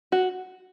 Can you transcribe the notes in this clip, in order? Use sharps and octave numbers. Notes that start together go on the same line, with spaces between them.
F#4